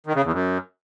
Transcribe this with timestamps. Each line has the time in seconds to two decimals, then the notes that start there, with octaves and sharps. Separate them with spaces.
0.06 D#3
0.15 C#3
0.24 E2
0.33 F#2